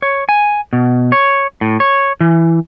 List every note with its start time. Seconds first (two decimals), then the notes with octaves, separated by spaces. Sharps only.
0.02 C#5
0.29 G#5
0.73 B2
1.12 C#5
1.61 A2
1.80 C#5
2.21 E3